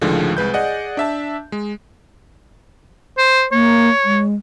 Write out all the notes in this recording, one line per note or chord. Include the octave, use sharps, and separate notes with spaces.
C#2 A2 D3 D#3 F3 G#3
C2 G#3 B4 G6
G#4 D5 D#5 F#5
D4 E5 A5
G#3
C5
A#3 C#5
G#3